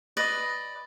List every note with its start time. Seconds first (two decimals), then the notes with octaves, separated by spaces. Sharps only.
0.17 B4 D5 D#5